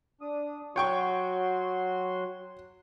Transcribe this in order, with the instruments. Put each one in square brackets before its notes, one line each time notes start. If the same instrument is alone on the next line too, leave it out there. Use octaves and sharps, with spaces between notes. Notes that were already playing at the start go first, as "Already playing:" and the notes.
[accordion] D4 D#6
[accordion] F#3 F#4 C6 [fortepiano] C#5 G5 C#6